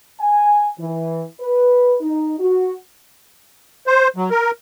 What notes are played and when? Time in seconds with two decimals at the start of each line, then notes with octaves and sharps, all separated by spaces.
0.20 G#5
0.78 E3
1.39 B4
2.00 D#4
2.39 F#4
3.87 C5
4.16 F#3
4.31 A#4